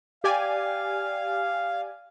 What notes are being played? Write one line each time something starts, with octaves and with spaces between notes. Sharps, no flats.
G4 D5 F5 G#5